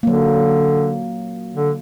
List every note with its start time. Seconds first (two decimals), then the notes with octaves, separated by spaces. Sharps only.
0.03 D3 F#3 A#3
1.54 D3